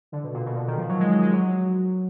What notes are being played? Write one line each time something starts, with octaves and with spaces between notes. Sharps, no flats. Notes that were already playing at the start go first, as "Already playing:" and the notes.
D3
B2
A#2
B2
D3
D#3
F3
F#3
G#3
G#3
G#3
F#3